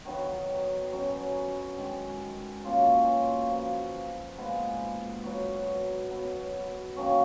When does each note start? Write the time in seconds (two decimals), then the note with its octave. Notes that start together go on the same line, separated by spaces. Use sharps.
0.05 D#3 F#3 B3 D#4
0.92 B2 F#3 C#4 F#4
1.78 D#3 G#3 D#4
2.65 B2 A#3 C#4 F4
3.50 F3 B3 F#4
4.38 A#2 G#3 B3 D#4
5.23 F#3 B3 F#4
6.10 B2 F#3 B3 F#4
6.96 D#3 A#3 C#4 F#4